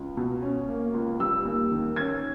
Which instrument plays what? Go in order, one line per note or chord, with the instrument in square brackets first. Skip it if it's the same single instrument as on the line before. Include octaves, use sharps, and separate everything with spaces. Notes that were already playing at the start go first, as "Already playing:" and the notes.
Already playing: [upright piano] C#2
B2
C#4
A#3
C#2
G3 E6
D#2
D#3
C#4 G#6